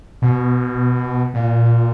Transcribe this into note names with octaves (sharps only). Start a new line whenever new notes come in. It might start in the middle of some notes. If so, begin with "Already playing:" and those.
B2
A#2